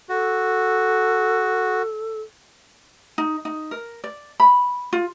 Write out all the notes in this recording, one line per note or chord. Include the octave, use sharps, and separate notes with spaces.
F#4 A4
D#4
D#4
A#4
D5
B5
F4